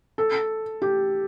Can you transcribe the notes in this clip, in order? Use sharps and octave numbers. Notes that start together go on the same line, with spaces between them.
A4
G4